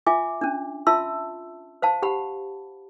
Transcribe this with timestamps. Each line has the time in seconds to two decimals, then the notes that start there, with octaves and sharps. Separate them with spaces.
0.07 F4 E5 G#5 D6
0.41 C#4 D4
0.87 F4 E5 A5 C6 E6
1.82 C5 F5 A5
2.02 G4 F#5 B5